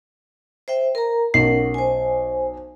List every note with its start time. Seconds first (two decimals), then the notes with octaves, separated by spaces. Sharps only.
0.68 C5 E5 G5
0.95 A#4 A#5
1.34 B1 C#4 A#4 F#5 C7
1.74 C5 G#5